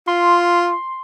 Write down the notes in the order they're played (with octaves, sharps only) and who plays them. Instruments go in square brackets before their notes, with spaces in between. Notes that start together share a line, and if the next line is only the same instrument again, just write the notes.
[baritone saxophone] F4 [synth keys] C6